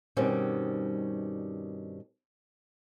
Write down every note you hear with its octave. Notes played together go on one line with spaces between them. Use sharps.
G2 B2 D#3 G3 C4 C#4